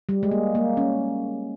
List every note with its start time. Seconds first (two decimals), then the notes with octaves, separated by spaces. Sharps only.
0.09 G3
0.23 G#3
0.31 A#3
0.55 A#3
0.77 C#4